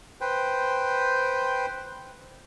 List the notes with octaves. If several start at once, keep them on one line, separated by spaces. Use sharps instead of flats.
B4 C5 G5